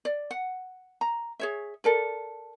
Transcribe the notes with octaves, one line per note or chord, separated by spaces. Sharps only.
D5
F#5
A#5
G#4 C#5 E5
A4 A#4 D5